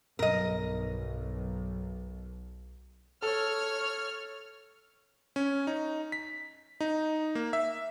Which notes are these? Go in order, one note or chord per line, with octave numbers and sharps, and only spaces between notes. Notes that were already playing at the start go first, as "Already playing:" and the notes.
B1 G2 B2 A#4 D#5
A4 C#5 F6
C#4
D#4
B6
D#4
A#3
E5